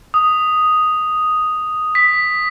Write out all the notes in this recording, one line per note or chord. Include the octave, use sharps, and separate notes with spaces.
D#6
B6